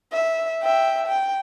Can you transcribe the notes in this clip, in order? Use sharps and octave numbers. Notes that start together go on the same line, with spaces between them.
E5
E5 G5
G5